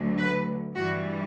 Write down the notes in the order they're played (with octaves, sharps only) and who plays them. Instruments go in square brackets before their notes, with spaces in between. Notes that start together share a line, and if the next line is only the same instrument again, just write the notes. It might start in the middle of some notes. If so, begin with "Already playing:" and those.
Already playing: [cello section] D2 D3 F#3
B4
G2 E3 G3 F#4